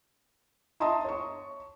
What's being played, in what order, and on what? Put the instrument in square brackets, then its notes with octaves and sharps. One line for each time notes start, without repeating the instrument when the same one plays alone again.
[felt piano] D#5 E5 A5 A#5 C6 D#6
C#5 C#6